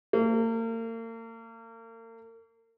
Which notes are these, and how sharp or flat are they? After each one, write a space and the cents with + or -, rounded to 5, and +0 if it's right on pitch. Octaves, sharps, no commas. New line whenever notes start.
A#3 -40